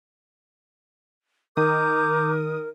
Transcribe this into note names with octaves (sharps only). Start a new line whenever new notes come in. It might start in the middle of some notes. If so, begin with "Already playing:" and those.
D#3 A#4 A#5 D6 D#6 G6